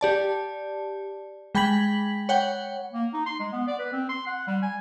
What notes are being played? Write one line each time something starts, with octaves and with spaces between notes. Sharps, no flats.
G4 D5 A5
G#3 G5 B5 G#6 B6 F#7
C#5 F#5 G5
A#3
D#4
C6
G#3
B3
D5
B4
C4
C6
F#5
G3
G#5